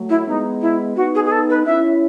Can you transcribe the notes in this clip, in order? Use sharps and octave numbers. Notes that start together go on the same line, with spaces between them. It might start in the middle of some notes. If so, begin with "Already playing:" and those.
Already playing: F#3 A3
E4
G#3 B3 D#4
E4
B3 D#4 F#4
G#4
G#4
A4
B4
C#4 E4 E5